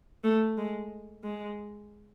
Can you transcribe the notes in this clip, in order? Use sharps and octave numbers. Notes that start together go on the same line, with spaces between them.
A3
G#3
G#3